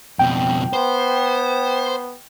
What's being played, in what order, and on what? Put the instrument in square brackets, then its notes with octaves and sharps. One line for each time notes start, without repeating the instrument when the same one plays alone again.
[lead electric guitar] F2 B2 [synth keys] G5
[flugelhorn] B3 [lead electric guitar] C5